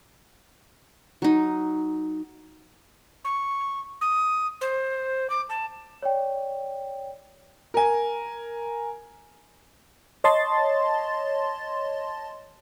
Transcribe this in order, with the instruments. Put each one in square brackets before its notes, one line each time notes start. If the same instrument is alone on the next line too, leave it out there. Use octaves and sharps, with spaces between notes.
[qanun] F#3 D#4
[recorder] C#6
D#6
C5
D6
A5
[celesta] C#5 D5 G5
[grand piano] A#4 G#5
[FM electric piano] C#5 D#5 A5 C6 A6